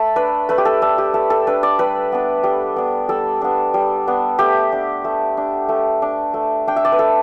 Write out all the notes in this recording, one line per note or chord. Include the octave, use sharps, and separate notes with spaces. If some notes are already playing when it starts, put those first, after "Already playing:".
Already playing: A3 A5 B5
D4 B4
A3 B4
G4
A4
D4 A4
G4
A3 A4
A4
D4 B4
D5
G3 B4
B3 D4
G3
B3 D4
G3 A4
B3 D4
G3
B3 D4
A3 G4
D4
A3
D4
A3
D4
A3
D4 G5
E5
D5
B4
A3 A4